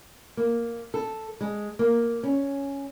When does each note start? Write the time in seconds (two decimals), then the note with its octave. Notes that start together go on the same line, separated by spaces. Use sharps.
0.37 A#3
0.94 A4
1.41 G#3
1.79 A#3
2.23 C#4